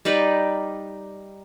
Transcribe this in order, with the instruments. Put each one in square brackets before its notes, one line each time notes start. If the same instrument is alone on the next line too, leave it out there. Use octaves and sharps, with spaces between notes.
[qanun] G3 D#4 B4 D5